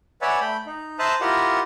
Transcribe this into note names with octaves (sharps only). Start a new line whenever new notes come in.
B4 C#5 D5 E5 F#5 G#5
A3 G5 B5
D#4
C5 E5 A5 A#5 D#6 F#6
E4 F4 G4 A#4 D#5 F#5